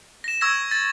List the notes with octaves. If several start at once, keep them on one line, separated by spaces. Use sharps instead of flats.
A#6 E7
C#6 E6 G#6 A#6
A6